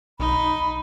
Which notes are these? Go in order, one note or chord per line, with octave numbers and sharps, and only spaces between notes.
B1 D#4 B5